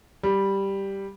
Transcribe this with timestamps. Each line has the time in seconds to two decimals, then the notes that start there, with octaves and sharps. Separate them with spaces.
0.23 G3